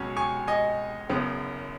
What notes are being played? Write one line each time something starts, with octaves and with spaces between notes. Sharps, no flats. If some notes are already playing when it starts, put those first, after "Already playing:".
Already playing: C#2 B2 F#3 C#4
G#5 C#6
D#5 G#5
F#1 F#2 C#3 B3